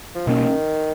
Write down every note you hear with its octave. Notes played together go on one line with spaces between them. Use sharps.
F3
B2 D#3 A#3 C#4